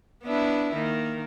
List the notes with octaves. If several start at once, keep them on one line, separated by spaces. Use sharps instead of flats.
B3 D4 E4
D#3 A#3